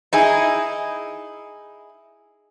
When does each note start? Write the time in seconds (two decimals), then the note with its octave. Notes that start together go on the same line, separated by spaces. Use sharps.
0.13 D#4 E4 G#4